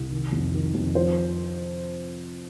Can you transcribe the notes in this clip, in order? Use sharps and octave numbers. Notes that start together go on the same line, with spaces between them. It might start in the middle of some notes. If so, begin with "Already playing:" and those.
Already playing: C2
D#3
F2
D#3
F2
F3 C5